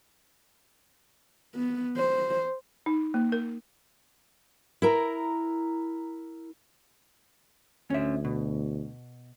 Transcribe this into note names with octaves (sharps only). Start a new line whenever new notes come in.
B3
C5
D#4
A#3
A#4
E4 A#4 A#5
D2 C#4 E5
B2